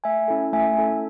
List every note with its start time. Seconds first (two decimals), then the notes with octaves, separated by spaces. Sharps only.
0.04 A3 E5 G#5
0.28 C#4 E4 A4
0.53 A3 E5 G#5
0.77 C#4 E4 A4